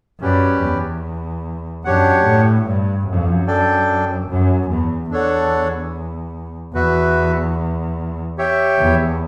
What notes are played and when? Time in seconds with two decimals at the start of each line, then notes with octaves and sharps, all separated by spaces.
0.20 F#2 C#4 G4 B4 D5
0.62 E2
1.84 F#2 D4 G4 C#5 F#5
2.25 A2
2.66 G2
3.07 F#2
3.47 D4 A4 D5 G5
4.29 F#2
4.70 E2
5.11 E2 D4 A4 C#5 F#5
6.74 E2 F#4 B4 E5
8.38 G4 C#5 E5 G5
8.79 E2